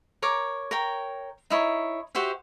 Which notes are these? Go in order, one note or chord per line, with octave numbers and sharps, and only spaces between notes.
A#4 C#5 D6
A#4 C#5 G5
D#4 E4 C#5
F#4 G4 C5 E5